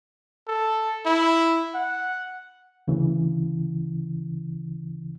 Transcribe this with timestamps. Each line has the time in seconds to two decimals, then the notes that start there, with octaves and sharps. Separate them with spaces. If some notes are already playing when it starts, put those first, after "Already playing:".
0.48 A4
1.06 E4
1.75 F#5
2.88 D2 C#3 E3